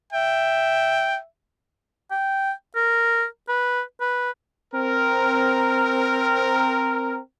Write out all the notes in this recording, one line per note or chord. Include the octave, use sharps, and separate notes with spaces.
E5 G5
G5
A#4
B4
B4
C4 A#4